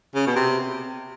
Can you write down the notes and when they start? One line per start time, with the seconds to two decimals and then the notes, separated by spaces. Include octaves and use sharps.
0.15 C#3
0.27 B2
0.36 C3